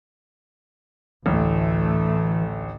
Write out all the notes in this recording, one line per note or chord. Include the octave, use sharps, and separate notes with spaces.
A1 D2 A2 E3 A3